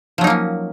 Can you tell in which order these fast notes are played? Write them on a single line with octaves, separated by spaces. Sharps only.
F3 F#3 D#4 A#3 C#4